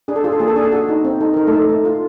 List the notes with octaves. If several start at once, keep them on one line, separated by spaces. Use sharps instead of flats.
D4 G#4
A4
F4 G#4
A4
A#3 G#4
A4
D4 G#4
A4
F#4 G#4
D#4
C4
D#4 A4
D#4 A#4
A3 A4
D#4
A3
F4